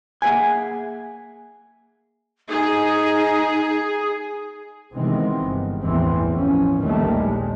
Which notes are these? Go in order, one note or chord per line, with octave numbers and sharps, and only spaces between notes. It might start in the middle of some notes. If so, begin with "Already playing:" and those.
A#3 G#4 B4 E5 F#5 G#5
D#4 G#4
C3 D#3 E3 G#3 B3 C4
G1
A1 E2 A2 E3 C4
F3 C#4
A#1 D#2 A2 D#3 G3 A3
G#3